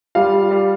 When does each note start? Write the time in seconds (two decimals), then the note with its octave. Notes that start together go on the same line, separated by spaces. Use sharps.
0.15 G3 F4 F5
0.33 G3
0.51 G3